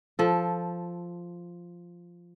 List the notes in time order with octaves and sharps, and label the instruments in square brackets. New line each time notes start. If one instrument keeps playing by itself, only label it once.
[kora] F3 A4